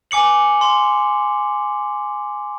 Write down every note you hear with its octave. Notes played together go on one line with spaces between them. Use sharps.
G#5 D6 C#7 F#7
C6